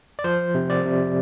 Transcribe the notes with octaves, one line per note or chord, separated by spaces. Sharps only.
D5
F3 C5
C3
D5
C3